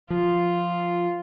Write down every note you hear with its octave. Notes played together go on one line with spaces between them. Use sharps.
F3 F4